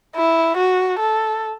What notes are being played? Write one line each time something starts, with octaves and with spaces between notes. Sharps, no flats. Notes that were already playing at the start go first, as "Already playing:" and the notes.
E4
F#4
A4